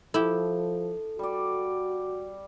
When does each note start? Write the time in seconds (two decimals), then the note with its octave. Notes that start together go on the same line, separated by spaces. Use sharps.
0.14 F3 E4 G4 A4
1.19 G3 F#4 D5